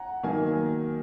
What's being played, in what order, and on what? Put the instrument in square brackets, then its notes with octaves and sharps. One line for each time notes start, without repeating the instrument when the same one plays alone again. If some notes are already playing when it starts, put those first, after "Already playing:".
Already playing: [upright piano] F#5 G#5 A#5
D#3 F#3 A#3 G#5